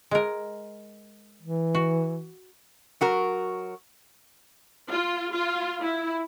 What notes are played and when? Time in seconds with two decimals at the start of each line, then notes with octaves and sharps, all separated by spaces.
0.11 G#3 A#4
1.42 E3
1.75 F#4
3.01 F#3 F#4 A#4
4.91 F4
5.32 F4
5.83 E4